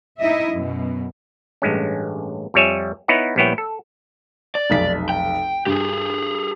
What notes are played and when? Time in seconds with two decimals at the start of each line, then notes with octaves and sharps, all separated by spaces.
0.19 D#4 E4 D#5 E5
0.52 F#2 B2
1.62 A1 G2 G#3 C#4
2.54 F2 F3 G3 C#5 E5 G#5
3.08 B3 D#4 E4 C#5 F#5
3.36 A#1 G3 B3 E4 C#5 G5
3.58 A4
4.55 D5
4.70 F1 B1 B6
5.09 G5
5.66 G2 G4 G#4